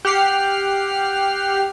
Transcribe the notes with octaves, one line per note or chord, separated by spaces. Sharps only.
G4 F#5 F6 C7